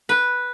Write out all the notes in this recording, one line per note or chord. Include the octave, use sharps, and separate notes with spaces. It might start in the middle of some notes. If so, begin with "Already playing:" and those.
B4